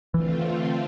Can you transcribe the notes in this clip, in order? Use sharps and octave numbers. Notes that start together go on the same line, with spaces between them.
D3 E3 A3 C4 F4